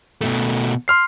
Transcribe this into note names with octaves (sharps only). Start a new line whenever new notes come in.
B2 A3
C6 F6 C7